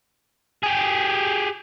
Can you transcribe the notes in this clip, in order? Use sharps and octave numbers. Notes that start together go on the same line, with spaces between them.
G4 G#4